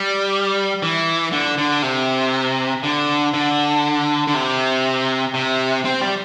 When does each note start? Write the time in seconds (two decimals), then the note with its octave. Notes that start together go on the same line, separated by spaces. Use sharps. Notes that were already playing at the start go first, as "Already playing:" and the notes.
Already playing: G3
0.82 E3
1.33 D3
1.58 D3
1.82 C3
2.83 D3
3.34 D3
4.27 D3
4.34 C3
5.34 C3
5.85 C4
6.01 G3